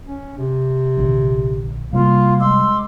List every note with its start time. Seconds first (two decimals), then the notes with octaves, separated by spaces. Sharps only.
0.06 C#4
0.38 C3
0.97 A#1 D3 F3
1.93 C3 G3 A#3 C#4 F4
2.40 G#3 C6 D6 E6